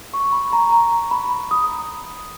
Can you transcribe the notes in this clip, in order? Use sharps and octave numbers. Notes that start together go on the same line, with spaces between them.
C#6
B5
A#5
A#5
B5
D#6